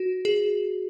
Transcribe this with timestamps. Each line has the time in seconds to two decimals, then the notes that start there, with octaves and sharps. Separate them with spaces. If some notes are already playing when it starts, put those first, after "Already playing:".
Already playing: F#4
0.25 G#4